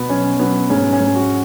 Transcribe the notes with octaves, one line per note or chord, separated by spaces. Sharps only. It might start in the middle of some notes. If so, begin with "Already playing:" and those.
Already playing: B2 B3
F#3 C#4
F#3 B3
G#2 C#4
C#4
G#2
F#4